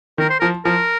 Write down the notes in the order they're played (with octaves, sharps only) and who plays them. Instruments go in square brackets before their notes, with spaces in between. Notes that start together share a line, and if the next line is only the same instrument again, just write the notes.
[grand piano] D#3 [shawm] A#4
[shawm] C5
[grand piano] F3 [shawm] A#4
[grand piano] F3 [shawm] A#4